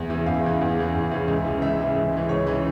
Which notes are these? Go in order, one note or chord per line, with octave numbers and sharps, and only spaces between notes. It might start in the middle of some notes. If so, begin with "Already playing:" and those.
Already playing: E2
C#3 E3
E2 F5
C#3 E3
E2
C#3 E3
E2
C#3 E3
C#2
C#3 E3
C#2 E5
C#3 E3
C#2
C#3 E3
C#2 C#5
C#3 E3